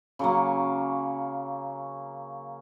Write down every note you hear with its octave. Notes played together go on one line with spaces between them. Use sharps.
C#3 F#3 A#3